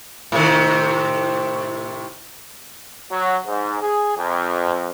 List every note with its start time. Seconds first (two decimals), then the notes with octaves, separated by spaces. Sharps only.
0.32 A2 C3 D#3
3.11 F#3
3.46 G#2
3.82 G#4
4.17 F2